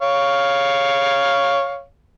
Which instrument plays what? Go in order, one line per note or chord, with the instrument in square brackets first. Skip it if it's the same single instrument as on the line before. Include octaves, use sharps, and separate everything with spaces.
[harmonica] C#5 F5